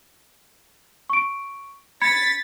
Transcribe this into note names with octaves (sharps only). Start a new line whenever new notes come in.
C#6 D7
B5 G#6 A6 B6 C#7